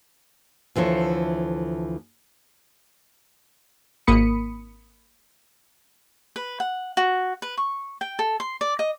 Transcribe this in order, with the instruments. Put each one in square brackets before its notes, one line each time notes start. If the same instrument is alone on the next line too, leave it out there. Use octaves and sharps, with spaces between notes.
[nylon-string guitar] D2 E3 F3 A4 C#5
[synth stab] G#1 A#3 B5 D#6 C#7
[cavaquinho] B4
F#5
F#4
B4
C#6
G5
A4
C6
D5
D#5